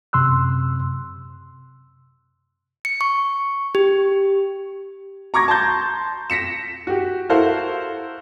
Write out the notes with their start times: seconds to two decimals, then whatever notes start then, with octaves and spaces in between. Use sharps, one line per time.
0.13 F#2 C3 C6 E6 F#6
2.85 C#7
3.01 C#6
3.75 G4
5.34 A#5 C#6 D6 G#6 A#6
5.48 A5 A#5 C6 G6 A6
6.30 A#6 B6 C#7 E7
6.87 F#4 G4
7.29 E4 F#4 A4 A#4 C5 F5